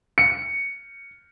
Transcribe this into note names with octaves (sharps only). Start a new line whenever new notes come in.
C#7